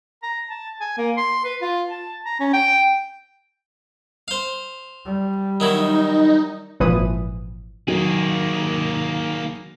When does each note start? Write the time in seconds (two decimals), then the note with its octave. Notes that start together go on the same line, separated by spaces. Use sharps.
0.23 A#5
0.49 A5
0.80 G#5
0.97 A#3
1.17 C6
1.44 B4
1.61 F4
1.89 A5
2.25 A#5
2.40 C#4
2.53 G5
4.28 C5 F5
5.06 G3
5.60 D#3 F#3 D#4 E4
6.80 G#1 A#2 E3 F3 B4 D#6
7.88 D#3 F#3 A#3 G#4